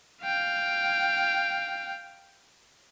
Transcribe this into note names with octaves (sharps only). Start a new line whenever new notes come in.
F5 G5